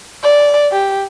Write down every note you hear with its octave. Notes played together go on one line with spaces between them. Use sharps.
D5
G4